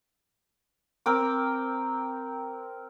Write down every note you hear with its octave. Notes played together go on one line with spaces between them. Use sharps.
C4 A#4 G5 D6